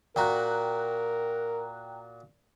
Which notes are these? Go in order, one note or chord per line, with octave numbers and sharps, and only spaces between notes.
A#2 F#4 A#4 G5 A#5 F#6